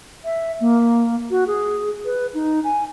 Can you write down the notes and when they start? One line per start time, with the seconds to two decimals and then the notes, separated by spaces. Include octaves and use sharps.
0.24 E5
0.60 A#3
1.30 F#4
1.47 G#4
2.05 B4
2.34 D#4
2.64 G#5